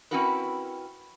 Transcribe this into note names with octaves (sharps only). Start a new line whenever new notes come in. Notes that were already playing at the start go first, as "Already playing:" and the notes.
C4 C#4 E4 F#4 A#4 B4